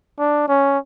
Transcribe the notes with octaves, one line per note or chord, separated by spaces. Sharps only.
D4
C#4